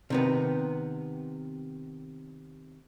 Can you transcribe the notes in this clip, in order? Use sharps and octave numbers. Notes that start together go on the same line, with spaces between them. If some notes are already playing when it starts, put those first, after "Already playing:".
C3 D#3 B3